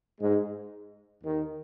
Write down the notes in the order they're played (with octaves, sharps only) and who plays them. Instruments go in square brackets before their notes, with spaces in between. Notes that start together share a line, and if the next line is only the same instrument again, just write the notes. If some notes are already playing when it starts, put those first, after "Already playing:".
[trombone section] G#2 G#3
D#2 D#3